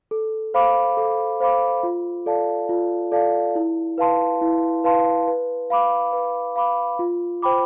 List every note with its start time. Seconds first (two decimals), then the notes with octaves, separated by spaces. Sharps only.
0.11 A4
0.54 C5 F5 B5 D6
0.97 A4
1.40 C5 F5 B5 D6
1.83 F4
2.26 A4 D5 F5 A5
2.69 F4
3.12 A4 D5 F5 A5
3.55 E4
3.98 B4 F5 A5 C6
4.41 E4
4.84 B4 F5 A5 C6
5.27 B4
5.70 F5 B5 D6
6.13 B4
6.56 F5 B5 D6
6.99 F4
7.42 C5 G5 B5 D6